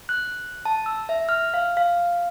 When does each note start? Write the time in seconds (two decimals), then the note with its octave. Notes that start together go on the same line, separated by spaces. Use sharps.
0.09 F#6
0.65 A5
0.86 E6
1.09 E5
1.29 F6
1.54 F5
1.77 F5